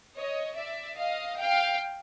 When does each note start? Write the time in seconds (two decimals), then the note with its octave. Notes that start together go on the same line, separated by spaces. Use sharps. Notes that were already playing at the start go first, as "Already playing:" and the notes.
0.16 C#5 D#5
0.57 D5 E5
0.98 D#5 F5
1.39 F5 G5